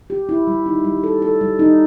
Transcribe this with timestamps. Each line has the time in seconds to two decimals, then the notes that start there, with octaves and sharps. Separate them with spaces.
0.10 G4
0.29 E4
0.47 G3
0.66 D#4
0.84 G3
1.04 A4
1.22 A4
1.41 G3
1.59 D#4